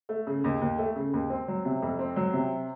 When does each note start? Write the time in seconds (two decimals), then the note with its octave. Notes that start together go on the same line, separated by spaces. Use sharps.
0.09 A3
0.27 C#3
0.44 D#2
0.61 D#2
0.78 A3
0.96 C#3
1.13 D#2
1.30 C4
1.48 F#3
1.65 C3
1.82 F2
1.99 C4
2.16 F#3
2.33 C3